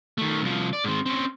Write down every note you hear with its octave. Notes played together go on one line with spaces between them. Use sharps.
D#3 A3
C2 F3
D5
G#2 C4
C4 C#4